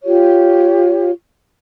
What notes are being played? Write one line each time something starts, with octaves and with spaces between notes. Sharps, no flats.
F4 G4 C#5